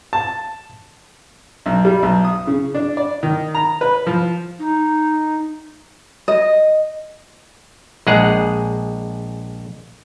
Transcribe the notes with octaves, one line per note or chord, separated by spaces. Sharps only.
A5
B1
G3
B1
D#6
C#3
D4
D5
D#3
A#5
B4
F3
D#4
D#5
A#1 G#3 G#4 F#5